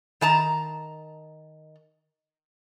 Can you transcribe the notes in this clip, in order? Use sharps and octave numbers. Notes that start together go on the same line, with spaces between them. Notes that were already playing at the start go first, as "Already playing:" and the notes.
D#3 A5 A#5